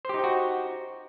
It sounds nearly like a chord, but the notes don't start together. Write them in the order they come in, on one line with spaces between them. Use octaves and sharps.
C5 G4 D#4 G5 F#4